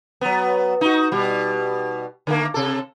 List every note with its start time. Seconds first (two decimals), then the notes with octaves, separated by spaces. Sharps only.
0.21 F#3 B3
0.81 D#4 F#4
1.12 B2 G3
2.27 D3 A3 A#3
2.54 C3 A4